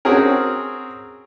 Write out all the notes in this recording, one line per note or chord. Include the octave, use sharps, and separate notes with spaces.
C4 C#4 F#4 G#4 A#4